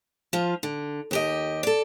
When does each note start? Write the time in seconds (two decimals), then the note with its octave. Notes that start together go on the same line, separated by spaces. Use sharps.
0.33 F3 F4
0.63 D3
1.11 D#2 G4 D#5
1.63 A4 D5